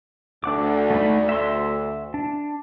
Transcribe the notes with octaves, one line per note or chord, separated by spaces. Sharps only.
D2 D4 F#5 D6
A3 D#4 B5
E5 C6
D4